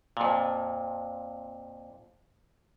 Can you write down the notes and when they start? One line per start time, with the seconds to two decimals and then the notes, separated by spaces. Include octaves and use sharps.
0.17 F2 A#2